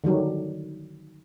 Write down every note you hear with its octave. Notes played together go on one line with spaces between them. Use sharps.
D3 D#3 F#3 G3